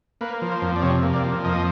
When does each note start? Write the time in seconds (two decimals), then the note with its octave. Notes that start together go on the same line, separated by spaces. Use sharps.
0.21 A#3 B4
0.42 F3
0.52 C5
0.62 F2
0.76 D5
0.82 C3 C#5
1.03 A#3
1.14 D5
1.24 F3
1.45 F2 D#5